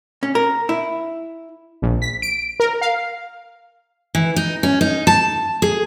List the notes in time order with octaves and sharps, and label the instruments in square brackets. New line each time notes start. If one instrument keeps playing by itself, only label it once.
[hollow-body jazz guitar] C#4
A#4
E4
[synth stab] A#1
B6
D7
A#4
F5
[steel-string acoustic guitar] E3
D#4
C#4
D#4
A5
G#4